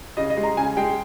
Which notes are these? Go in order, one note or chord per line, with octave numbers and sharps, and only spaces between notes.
C#3 D#5
D#5
G#3
A#5
C#3 G#5
G#3 G5